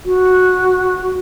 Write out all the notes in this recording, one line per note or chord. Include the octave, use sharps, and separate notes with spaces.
F#4